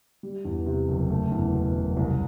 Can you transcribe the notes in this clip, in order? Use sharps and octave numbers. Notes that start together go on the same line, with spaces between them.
G3
E2
C3
F#1
A3
E2
B2
F#1
C2